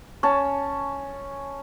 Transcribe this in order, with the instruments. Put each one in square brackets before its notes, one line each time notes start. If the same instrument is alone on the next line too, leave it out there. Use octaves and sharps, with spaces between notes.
[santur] C#4 A5